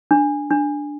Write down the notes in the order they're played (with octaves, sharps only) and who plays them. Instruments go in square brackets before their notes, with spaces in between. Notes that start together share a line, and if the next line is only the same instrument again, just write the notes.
[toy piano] D4
D4